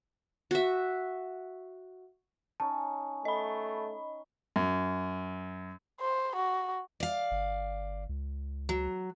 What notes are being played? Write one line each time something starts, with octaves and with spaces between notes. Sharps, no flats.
F#4 E5
C#4 D#4 A5
A3 D#5 B5
F#2
C5
F#4
D5 F5
G1
C#2
F#3